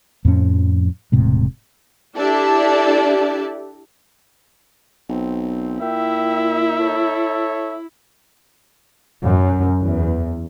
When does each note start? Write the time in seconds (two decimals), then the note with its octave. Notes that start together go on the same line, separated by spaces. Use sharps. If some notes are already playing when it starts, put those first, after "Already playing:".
0.25 F2 A2 F3 C#4
1.12 E1 A2 C3 G#3
2.16 D4 E4 G4 A4 D5 E5
5.09 B1 C4
5.81 A#2 E4 E5 G5
6.79 A4 C#5
9.23 F#2
9.82 E2